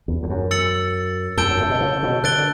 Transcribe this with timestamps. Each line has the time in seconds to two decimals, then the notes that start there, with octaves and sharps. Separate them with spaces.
0.08 E2
0.23 E2
0.30 F#2
0.51 E6 A6 C#7 F#7
1.37 E2 A5 E6 G6 D7 G7
1.48 F#2
1.59 A2
1.70 B2
1.81 C#3
2.03 B2
2.24 D3 F#6 A6 D7 G7